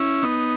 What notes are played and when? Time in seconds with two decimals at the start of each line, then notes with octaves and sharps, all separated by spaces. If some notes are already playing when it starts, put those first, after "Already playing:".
Already playing: C#4 E4
0.23 B3 D#4